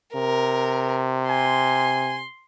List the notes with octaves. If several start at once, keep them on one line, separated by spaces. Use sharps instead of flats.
C3 A#4
G#5 C6